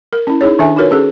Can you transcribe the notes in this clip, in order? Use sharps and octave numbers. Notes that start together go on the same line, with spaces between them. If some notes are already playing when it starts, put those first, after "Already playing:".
A#4
C#4 E4
D#4 E4 G#4 C#5
D#3 D4 A4 E5 G#5
D#4 F4 F#4 A#4 B4 C#5
C#4 G#4 A4